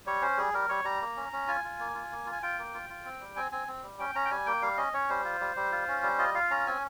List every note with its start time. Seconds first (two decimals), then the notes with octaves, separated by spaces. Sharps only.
0.06 G3 C#5
0.22 C#4 C5
0.38 G3 G#4
0.54 G3 A#4
0.69 G3 C#5
0.84 G3 A#5
1.01 A#3
1.16 C#4
1.33 C#4
1.48 F4 G#5
1.64 F4
1.79 A#3
1.94 F4
2.11 A#3
2.26 F4
2.32 G#5
2.43 F4 G5
2.58 A#3
2.74 F4
2.90 F4
3.05 C4
3.20 G3
3.36 C4 G#5
3.52 C4 G#5
3.68 C4
3.83 G3
3.99 C#4 G5
4.15 C#4 A#5
4.25 G5
4.31 G3 G#5
4.46 A#3 G5
4.62 G3 F5
4.77 C#4 D#5
4.93 C#4 C#5
5.10 G3 C5
5.25 F4
5.40 G3
5.56 G3
5.72 F4
5.88 C#4
6.03 G3
6.18 F4 D#5
6.34 F4 F5
6.50 C#4 A#5
6.67 C4 G#5